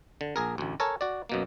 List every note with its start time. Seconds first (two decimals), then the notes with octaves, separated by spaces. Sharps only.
0.21 D3
0.36 A#1 G#4 A#4
0.58 A1 D2
0.80 A4 A#4 C#5 G#5 A5
1.01 F#4 D5
1.29 F#2 B2 A#3